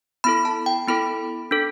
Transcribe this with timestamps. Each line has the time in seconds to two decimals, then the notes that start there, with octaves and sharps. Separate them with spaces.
0.24 B3 E4 A4 B5
0.45 A5
0.66 G5
0.87 B3 E4 A4 B5
1.51 D4 A4